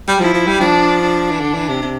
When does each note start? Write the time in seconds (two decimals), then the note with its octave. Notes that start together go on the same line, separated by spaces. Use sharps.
0.08 G3
0.19 F3 E4
0.34 F3
0.47 G3
0.60 F3 D4
1.01 D4
1.31 E3
1.41 D3
1.54 E3
1.69 C3
1.82 C3